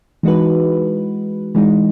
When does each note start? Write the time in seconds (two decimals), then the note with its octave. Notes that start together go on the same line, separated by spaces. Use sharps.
0.23 E3 G#3 D#4 F#4 B4
1.55 E3 G#3 D#4